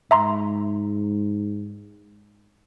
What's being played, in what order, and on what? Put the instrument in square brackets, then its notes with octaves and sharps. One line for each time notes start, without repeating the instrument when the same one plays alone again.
[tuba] G#2 [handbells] E5 A#5 C6